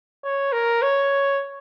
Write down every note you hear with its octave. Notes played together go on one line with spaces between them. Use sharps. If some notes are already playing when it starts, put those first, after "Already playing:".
C#5
A#4
C#5